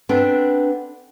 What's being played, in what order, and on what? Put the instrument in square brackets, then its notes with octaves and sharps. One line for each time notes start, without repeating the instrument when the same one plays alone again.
[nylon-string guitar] B3 C4 D4 A4